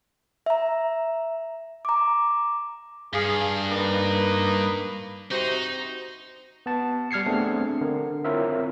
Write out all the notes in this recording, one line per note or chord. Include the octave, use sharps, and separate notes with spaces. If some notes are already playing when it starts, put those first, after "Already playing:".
E5 A#5
A#5 D6
G2 G#4 F5
A#3 D#4 B4
C3 D#4 F#4 C5
B3 A5
G3 F6 G#6 C7 C#7
A3 B3 C4 D4 G#4
D3 A#4
C4 E4 F4 A#4 C#5 E5